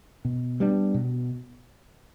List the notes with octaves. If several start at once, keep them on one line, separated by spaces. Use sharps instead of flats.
B2
G3 B3 D4
B2